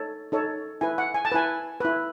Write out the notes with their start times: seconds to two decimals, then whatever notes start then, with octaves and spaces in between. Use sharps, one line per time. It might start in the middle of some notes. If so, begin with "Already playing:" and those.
Already playing: D#4 A4 C#5
0.32 D#4 A4 C#5
0.81 E4 B4 G#5
0.98 F#5
1.14 G#5
1.25 A5
1.32 E4 B4 G#5
1.80 E4 B4